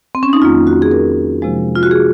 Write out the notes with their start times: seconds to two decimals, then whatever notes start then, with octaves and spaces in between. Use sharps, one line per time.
0.15 C4
0.23 C#4
0.33 D#4
0.42 F2 D#3 F#3 A#3 F4
0.67 F#4
0.82 G#4
0.91 A#4
1.42 C3 F3 G#3
1.75 F4
1.83 F#4
1.91 G#4